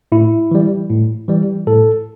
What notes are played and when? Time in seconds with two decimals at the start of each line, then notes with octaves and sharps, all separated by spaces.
0.12 A2 E4
0.51 E3 G3
0.90 A2
1.28 E3 G3
1.67 A2 A4